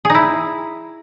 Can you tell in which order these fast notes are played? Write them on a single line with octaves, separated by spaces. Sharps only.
G#4 D#4 E4